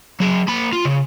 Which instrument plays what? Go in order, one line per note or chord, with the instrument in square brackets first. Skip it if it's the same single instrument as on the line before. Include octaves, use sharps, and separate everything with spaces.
[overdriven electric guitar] F#3 G#4
A#3 B5
F4
C#3